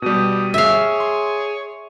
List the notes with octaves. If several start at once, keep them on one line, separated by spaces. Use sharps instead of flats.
B2 G3 G4 D#6
G#4 C#5 E5 F5
C6